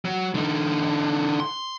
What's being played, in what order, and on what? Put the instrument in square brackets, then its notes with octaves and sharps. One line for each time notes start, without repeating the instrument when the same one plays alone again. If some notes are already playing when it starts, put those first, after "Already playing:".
[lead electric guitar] F#3
D3 D#4
C6